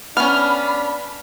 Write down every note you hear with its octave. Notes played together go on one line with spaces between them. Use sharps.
B3 C#4 D4 B5 F6